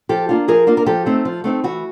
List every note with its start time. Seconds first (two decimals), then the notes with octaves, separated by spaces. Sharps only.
0.09 F3 G4 A4
0.29 A#3 D4 F4
0.48 F3 G#4 A#4
0.67 A#3 D4 F4
0.77 A#4
0.86 F3 G4 A4
1.06 A3 C4 D#4
1.25 F3
1.44 A3 C4 D#4
1.64 E3 F#4